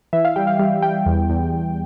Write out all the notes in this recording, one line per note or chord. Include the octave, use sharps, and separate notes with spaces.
E3 E5
F5
G3 G5
F5
G3 F5
G3 G5
E2
E2
E2